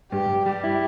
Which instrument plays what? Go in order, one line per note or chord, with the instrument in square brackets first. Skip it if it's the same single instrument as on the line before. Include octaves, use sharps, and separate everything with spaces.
[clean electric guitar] G2 [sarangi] G4
[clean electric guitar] G2
[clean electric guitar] G3 [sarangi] G4
[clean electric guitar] E4